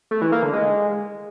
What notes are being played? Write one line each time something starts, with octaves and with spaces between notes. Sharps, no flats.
A3
E3
A#3
D3
G#3